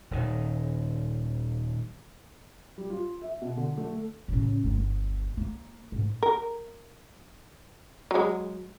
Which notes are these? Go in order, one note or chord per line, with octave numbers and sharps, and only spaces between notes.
D#1 D#3
G3
F4
E5
B2
D3
A3
A1 C#3
G1 D2
A#3
G#2
A#4
F#3 G#3